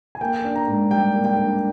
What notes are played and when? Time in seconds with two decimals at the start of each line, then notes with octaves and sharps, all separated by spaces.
0.15 G#5
0.21 A#3 G5
0.44 D4
0.55 A#5
0.67 G#2
0.91 G3 G5
1.14 A#3
1.25 G5
1.37 D4